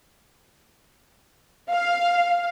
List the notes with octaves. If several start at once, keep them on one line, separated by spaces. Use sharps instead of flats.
F5